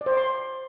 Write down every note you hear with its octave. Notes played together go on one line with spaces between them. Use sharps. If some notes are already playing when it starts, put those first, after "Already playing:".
D5
C5
D6
C6